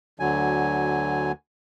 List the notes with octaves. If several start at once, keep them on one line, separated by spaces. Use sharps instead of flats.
D2 D3 F#3 G#5